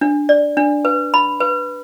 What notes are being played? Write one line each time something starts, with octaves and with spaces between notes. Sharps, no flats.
D4
D5
D4
B4
B5
B4